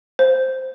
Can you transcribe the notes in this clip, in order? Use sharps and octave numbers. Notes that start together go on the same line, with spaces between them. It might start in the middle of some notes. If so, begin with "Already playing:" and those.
C5